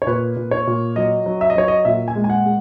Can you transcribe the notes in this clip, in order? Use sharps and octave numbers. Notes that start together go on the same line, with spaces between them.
C#5
A#2 B4
A#2
C#5
A#2
F#3 D#5
F#3
E5
D#5
F#3 C#5
D#5
A#2 E5
G#5
G#3
G#5
F#5
G#3